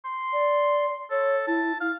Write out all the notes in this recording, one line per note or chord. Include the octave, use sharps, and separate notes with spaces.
C6
D5
A4 C#5
E4 A5
E4 F5